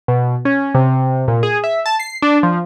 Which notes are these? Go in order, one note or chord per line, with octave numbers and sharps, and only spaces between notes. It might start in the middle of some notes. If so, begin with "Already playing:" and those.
B2
C#4
C3
A#2
G#4
E5
A5
C7
D4
F3